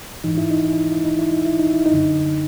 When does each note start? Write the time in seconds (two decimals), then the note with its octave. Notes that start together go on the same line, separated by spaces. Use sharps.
0.24 G#2 E3 D#4
0.38 E4
0.51 D#4
0.65 E4
0.78 D#4
0.92 E4
1.04 D#4
1.19 E4
1.32 D#4
1.46 E4
1.59 D#4
1.72 E4
1.86 D#4
1.92 F#2 D3